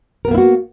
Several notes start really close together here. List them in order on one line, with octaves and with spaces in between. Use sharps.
A#4 B3 A#3 E4 F#4